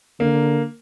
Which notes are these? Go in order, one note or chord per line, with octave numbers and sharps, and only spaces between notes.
D3 A#3